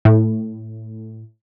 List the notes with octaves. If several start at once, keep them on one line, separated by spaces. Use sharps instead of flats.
A2